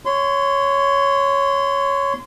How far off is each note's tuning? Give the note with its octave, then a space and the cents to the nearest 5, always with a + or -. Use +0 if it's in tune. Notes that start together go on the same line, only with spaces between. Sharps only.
C#5 +0 C6 -25